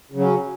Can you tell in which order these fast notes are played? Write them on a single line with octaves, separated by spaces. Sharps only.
C#3 F#3 C#4